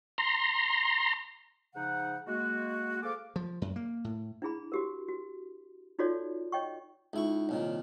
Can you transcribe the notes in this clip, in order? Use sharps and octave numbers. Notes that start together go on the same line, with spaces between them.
A#5 C6
G#2 C#3 F3 D#4 F#5
G#3 A#3 F#4
G#4 A4 C5 F5 D6
F3
F#2
A#3
A2
D4 E4 G#4 B5
F#4 G4 A#4
F#4
D#4 F4 F#4 A4 C#5 D5
C#5 D#5 G5 C#6
C#2 D#4 E4 C#6
C2 A#2 D#3 C#5